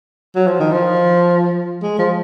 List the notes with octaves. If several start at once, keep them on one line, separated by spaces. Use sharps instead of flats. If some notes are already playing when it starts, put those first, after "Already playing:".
F#3
F3
D#3
F3
G#3
F3